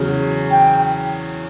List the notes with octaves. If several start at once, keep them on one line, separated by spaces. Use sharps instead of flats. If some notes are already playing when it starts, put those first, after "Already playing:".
Already playing: E2 C#3 F#3
G5